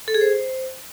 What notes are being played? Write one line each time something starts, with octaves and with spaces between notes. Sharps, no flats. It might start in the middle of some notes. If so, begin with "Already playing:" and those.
A4
G#4
C5